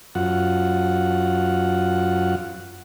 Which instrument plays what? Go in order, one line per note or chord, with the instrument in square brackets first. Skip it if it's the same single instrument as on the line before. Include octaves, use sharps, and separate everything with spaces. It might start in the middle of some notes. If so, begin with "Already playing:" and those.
[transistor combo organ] F#2 F4 F#5